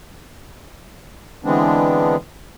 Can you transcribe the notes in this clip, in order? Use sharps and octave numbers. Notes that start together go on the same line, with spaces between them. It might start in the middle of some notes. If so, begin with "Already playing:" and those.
D3 E3 G#3 B3 C4 D4